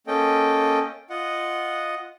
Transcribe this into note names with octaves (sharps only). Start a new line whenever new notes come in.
A#3 C#4 A4 D#5 G5
F4 D#5 F#5